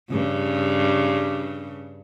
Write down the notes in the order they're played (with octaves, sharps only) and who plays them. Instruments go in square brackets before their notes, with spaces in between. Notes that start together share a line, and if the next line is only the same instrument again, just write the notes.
[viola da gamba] G2 C#3